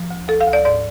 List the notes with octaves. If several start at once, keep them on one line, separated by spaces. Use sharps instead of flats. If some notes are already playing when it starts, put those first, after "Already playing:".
Already playing: F3
D2
D2 A4
F5
D2
D5
G#2 D5